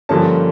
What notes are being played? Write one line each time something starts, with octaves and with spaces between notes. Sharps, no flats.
G2 D3 F3 A#3 C#4 A5